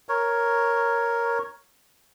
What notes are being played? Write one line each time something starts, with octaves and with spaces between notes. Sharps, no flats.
A#4 C#5